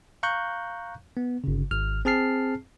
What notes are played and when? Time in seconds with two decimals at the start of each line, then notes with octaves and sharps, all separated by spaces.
0.23 F5 A#5 C#6 F#6 G6
1.17 B3
1.44 G1 C#3
1.71 G#1 F6
2.05 C4 G#4 A5 F6 C7